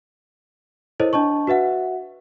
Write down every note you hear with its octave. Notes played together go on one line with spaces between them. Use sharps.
E4 A4 A#4 C5 C#5 D#5
D4 D#5 A5 C#6
F#4 B4 E5 F#5